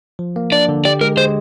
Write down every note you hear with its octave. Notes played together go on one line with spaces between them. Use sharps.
F3
A#3
D4 D5
D3
G4 D5
G#3 A#4
G#3 C5